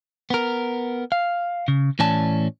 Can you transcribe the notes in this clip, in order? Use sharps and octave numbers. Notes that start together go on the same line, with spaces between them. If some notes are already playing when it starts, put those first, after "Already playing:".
B3 A#4
F5
C#3
A2 E3 C#4 D5 A5